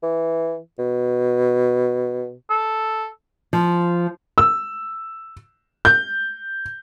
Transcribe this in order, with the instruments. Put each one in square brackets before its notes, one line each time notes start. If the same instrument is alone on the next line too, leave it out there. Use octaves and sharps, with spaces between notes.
[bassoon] E3
B2
[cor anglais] A4
[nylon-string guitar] F3
[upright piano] E6
G6